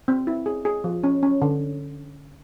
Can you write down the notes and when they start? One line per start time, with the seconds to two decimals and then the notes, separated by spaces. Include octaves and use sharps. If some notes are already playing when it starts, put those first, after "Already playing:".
0.08 C4
0.27 E4
0.46 G#4
0.65 G#4
0.84 F3
1.04 C#4
1.23 C#4
1.42 D3